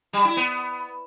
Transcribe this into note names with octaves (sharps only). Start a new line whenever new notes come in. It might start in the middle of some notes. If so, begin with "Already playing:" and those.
G3
E4
B3